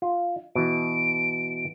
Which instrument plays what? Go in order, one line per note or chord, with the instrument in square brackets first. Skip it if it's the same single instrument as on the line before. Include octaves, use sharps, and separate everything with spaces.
[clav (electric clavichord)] F4
[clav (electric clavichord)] B2 E3 [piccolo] D7